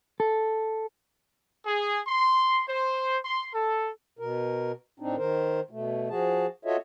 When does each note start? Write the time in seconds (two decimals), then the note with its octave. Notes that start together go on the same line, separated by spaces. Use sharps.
0.20 A4
1.66 G#4
2.07 C6
2.68 C5
3.25 C6
3.54 A4
4.19 B2 A#4
5.00 A2 C4 D4 D#4
5.16 D#3 A#4 C5
5.71 B2 A3
6.10 F3 F#4 G#4 A5
6.65 F4 F#4 A4 C#5 D#5 E5